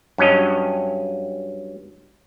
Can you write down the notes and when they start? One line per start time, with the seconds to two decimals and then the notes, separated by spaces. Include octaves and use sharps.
0.18 G2 F#3 C#4 D#5